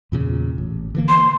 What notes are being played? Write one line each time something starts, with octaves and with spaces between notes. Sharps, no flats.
E2 A#2 C#3
A1
D3 E3 A#3
C6